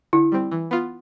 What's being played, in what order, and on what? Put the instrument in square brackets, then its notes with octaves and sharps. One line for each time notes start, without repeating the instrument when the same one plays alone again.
[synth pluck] D3 [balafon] E4
[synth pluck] G3 C4
E3
B3 F4